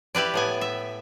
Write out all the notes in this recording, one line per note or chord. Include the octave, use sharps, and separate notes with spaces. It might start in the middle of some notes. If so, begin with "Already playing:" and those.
E4 G4 B4 D5
A2 B3 G#5
E5